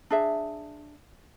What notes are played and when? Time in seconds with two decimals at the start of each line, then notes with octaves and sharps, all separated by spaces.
0.10 D4 G#4 E5